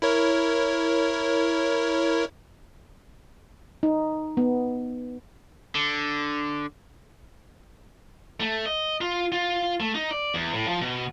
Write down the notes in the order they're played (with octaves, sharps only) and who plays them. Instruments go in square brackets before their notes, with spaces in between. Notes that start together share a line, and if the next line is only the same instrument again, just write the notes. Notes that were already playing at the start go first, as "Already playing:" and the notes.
[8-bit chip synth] E4 A#4 C#5
[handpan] D#4
B3
[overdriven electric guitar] D3
[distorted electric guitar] A3
D#5
F4
F4
A3
D#4
D5
E2
A2
F3
B2